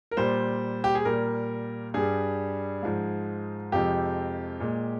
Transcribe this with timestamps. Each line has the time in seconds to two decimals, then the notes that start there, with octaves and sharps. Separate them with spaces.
0.11 A#4
0.17 A#2 G3 C5
0.84 G4
0.95 G#4
1.05 A#2 G3 A#4
1.94 G2 G3 G#4
2.83 G#2 F3 G#3
3.72 F2 C3 F3 G#3 G4
4.60 A#2 G#3